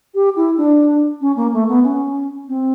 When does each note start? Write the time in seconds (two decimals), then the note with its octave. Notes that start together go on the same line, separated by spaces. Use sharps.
0.15 G4
0.36 E4
0.57 D4
1.21 C#4
1.36 A#3
1.53 A3
1.68 B3
1.84 C#4
2.48 C4